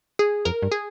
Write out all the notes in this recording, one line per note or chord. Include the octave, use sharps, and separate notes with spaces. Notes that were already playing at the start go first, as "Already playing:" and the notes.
G#4
F2 A#4
G2
G#4